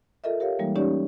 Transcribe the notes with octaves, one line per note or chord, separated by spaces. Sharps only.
F4 A4 A#4 D#5 E5
G4 A#4 C#5 F5
E3 G3 G#3 A#3 D#4
C#4 D#4 G4 C#5 D5